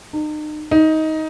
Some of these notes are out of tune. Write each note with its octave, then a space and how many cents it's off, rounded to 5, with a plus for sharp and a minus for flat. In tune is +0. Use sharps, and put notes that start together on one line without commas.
D#4 -40
D#4 +15